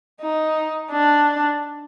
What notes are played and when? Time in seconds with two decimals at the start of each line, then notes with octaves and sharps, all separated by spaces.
0.22 D#4
0.91 D4